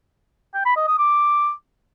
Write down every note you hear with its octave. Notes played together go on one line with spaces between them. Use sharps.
G5
B5
D#5
D#6
D6